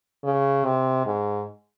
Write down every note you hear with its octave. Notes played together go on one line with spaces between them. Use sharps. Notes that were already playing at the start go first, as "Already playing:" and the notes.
C#3
C3
G#2